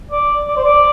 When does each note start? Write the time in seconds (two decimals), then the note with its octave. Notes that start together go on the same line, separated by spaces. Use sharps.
0.11 D5
0.48 D5
0.57 C5
0.65 D5